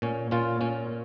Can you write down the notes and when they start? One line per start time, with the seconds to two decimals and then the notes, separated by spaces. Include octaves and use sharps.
0.02 A#2 C#4
0.31 A#2 C#4 F4
0.61 A#2 C#4